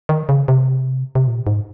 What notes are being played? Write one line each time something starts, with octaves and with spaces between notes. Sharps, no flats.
D#3
C#3
C3
C3
A#2
G#2